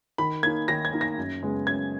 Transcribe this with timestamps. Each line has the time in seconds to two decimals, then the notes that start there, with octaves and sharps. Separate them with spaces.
0.18 D#3 B5
0.43 A#3 D#4 G#6
0.68 D#3 A#6
0.85 G#6
0.93 A#3 D#4
1.01 A#6
1.18 F#2
1.42 C#3 G#3 B3
1.67 F#2 G#6